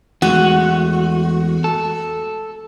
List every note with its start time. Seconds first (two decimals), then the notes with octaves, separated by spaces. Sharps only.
0.22 E2 G#3 A3 F#4
1.64 A4